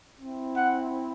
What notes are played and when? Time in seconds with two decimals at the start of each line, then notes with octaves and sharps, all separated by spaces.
0.19 C4 E4
0.57 F#5